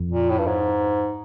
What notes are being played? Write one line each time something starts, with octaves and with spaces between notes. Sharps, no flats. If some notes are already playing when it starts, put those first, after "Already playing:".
Already playing: F2
A#2
A2
G2
G#2